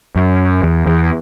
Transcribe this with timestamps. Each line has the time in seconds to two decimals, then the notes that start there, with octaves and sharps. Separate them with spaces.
0.16 F#2
0.63 E2
0.86 E2